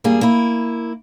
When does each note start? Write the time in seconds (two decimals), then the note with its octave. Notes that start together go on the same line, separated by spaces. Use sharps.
0.04 G2 G3 A#3 G#4
0.21 A#3 E4